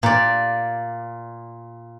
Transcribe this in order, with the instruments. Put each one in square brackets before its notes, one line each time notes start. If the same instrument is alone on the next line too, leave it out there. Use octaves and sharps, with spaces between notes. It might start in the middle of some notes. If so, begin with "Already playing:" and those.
[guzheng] A#2 D5